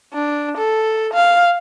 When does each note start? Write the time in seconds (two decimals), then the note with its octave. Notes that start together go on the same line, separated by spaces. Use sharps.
0.14 D4
0.57 A4
1.13 F5